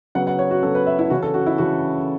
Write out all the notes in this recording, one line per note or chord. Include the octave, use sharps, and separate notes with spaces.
C#3 F#3 B3 F#5
F#5
C#5
F#4
C#3 F#3 B3 A4
B4
E5
E4
C#3 E3 C#4 F#4
A4
F#4
E4
C#3 E3 C#4 F#4